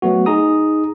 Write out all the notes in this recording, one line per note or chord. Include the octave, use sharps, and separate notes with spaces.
F#3 A3 B3 F#4
D#4 G#4 A#5 D#6